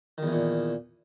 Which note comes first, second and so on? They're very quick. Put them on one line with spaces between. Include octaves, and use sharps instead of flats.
D#3 E2 E3 A#2